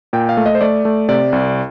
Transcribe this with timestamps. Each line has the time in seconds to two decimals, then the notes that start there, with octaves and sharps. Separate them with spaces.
0.13 A#2 G5
0.29 F5
0.37 A3
0.46 D#5
0.55 C5
0.61 A3 D5
0.85 A3
1.09 C3 D5
1.32 C2